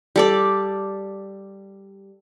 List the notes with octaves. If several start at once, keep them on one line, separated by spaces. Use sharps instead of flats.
G3 A4 D5